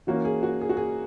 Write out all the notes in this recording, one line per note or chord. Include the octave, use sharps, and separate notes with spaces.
E3 A#3 C#4 F#4
G#4
F#4
G#4
F#4
G#4